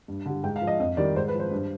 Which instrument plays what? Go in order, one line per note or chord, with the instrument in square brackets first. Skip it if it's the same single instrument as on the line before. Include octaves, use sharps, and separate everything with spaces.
[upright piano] G2
D3 G3
G#2 G5
F5
F3
D#5
F2 D#5
D#3 G3 D5
G#2 C5
B4
F3
C5
G2